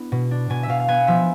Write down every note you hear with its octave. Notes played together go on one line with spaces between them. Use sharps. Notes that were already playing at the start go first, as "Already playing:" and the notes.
Already playing: B3 D4 E4
B2
D4
B2 G#5
E5
B2 F5
F5
B3 G#5
F3 E5